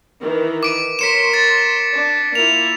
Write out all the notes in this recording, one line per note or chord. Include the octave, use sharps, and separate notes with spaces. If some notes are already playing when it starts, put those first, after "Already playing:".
D#3 E3
D6 D7 D#7
A#4 C#5 C6 B6 C#7 E7
A6
D4
A#3 E4 F4 F7